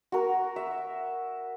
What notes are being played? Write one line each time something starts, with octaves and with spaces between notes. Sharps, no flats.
F#4 A#4
E5